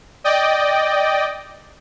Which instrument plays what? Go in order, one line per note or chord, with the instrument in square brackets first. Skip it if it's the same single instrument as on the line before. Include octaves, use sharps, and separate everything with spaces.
[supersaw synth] D5 D#5 G5